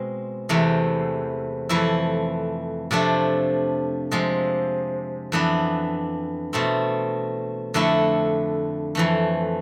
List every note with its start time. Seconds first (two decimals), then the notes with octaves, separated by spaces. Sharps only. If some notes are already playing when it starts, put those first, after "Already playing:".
Already playing: B2 G#3 C4
0.49 E2 C3 E3 A3
1.69 F2 E3 A3 E4
2.91 C3 F3 A3 D4
4.12 C3 F3 G#3
5.32 F2 E3 B3 D4
6.53 B2 A3 C4
7.74 F2 D3 A3 E4
8.95 F2 E3 A3